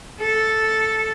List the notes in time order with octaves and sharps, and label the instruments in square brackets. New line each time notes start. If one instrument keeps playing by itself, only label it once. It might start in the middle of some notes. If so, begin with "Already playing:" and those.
[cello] A4